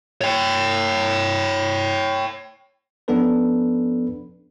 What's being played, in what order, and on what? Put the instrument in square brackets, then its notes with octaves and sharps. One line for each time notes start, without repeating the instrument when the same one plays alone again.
[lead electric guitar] C#5 G5
[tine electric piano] F3 B3 C#4 D4 A4 B4